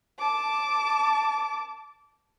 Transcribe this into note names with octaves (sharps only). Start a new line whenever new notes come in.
A5 D6